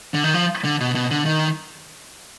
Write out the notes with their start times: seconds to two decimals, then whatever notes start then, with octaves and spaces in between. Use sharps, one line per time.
0.14 D3
0.24 D#3
0.34 F3
0.64 D3
0.80 B2
0.95 B2
1.11 D3
1.26 D#3